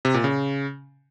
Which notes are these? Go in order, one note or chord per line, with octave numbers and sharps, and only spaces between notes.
C3
A#2
C#3